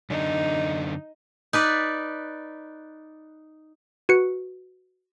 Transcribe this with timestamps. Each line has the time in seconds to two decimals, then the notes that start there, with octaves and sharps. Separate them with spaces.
0.10 F#2 D3 D4 D#4
1.53 D#4 B4 D5
4.09 F#4 B4 C#7